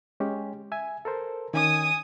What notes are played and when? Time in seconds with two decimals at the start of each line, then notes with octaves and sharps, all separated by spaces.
0.20 G#3 C#4 G4
0.72 E5 G#5
1.05 A4 A#4 C5
1.54 D#3 C#4 G#5 D#6